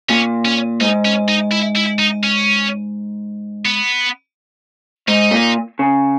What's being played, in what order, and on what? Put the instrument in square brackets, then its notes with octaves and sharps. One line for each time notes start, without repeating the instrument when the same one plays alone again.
[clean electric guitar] A#2 [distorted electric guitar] C#4
[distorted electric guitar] C#4
[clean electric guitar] G#2 [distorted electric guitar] D#4
[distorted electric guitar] C#4
D#4
E4
E4
D#4
C#4
B3
[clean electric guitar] G#2 [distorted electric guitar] D#4
[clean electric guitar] A#2
C#3